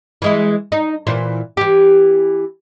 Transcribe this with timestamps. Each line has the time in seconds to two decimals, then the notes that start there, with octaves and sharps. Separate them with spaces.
0.22 E3 G#3 E4
0.72 D#4
1.07 A#2 E3 C5
1.57 E3 G4